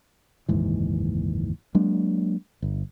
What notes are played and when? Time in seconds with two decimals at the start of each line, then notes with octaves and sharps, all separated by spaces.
0.49 F#1 D#2 G#2 E3
1.75 F#3 G#3 A#3 D4
2.62 G1